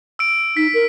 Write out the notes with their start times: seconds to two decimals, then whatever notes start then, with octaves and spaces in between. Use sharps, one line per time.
0.19 E6 D7
0.57 D#4 B6
0.74 A#4